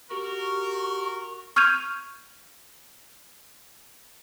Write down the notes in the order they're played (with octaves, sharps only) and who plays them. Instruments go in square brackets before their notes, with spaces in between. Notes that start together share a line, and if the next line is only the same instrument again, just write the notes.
[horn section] F#4 A#4 [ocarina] G4 [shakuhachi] C#6
[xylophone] C#6 F6 G6 G#6 D#7 F7